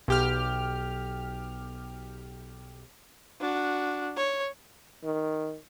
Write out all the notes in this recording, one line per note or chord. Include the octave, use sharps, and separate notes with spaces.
B1 G4 F6
D4 F#4
C#5
D#3